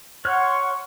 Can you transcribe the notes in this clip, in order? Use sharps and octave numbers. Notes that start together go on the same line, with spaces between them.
C#5 F#5 C6 C#6 F6 F#6